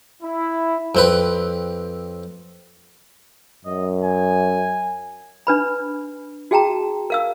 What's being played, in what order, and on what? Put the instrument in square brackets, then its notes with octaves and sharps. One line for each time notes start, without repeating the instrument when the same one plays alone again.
[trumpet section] E4
[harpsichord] F2 C4 B4
[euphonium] F#2 [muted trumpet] D#5
[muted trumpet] G#5
[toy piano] D4 B4 B5
F#4 G#4 G5 A5 A#5
A#4 F5 E6